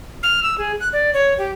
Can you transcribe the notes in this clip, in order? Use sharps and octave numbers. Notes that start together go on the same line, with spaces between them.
F6
E6
G#4
F#6
D5
C#5
G4